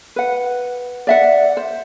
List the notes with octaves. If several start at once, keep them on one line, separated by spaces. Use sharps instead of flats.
B4 F#5
D5 E5 F#5
C5